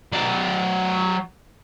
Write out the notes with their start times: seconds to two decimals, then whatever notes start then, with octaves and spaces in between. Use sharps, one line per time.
0.13 F#3 D5